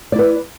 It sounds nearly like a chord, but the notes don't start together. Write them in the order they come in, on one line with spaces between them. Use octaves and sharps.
D5 E4 B4